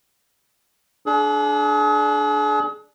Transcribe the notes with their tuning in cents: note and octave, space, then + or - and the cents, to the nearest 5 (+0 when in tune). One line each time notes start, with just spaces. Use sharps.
D4 +0 G#4 +40